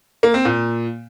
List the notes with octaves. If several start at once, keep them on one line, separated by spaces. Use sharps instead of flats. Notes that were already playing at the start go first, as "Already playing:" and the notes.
A#3
C4
A#2